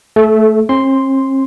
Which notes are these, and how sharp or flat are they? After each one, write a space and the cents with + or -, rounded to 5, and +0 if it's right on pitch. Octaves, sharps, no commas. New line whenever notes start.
A3 +0 A4 -30
C4 +45 C6 +0